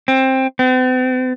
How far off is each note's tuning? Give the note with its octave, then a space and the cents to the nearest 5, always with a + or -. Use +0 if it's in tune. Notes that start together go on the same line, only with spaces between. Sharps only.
C4 +15
C4 -45